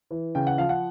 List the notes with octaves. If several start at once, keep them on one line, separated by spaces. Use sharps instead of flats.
E3
C#3 G5
F#5
F3 F5
F#5